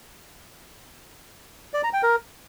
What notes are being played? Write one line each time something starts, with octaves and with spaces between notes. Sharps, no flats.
D5
A#5
G5
A#4